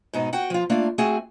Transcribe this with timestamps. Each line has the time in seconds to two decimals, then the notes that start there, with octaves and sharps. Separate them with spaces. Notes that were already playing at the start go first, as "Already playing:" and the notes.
0.14 G#2 B2 D#4
0.33 F#4 F#5 G5
0.50 F3 F4
0.70 A3 A#3 D4 F4
0.98 A3 C4 F#4 G#4